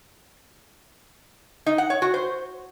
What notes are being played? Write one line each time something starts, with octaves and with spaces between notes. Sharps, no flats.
D#4
F#5
C#5
F#4
C5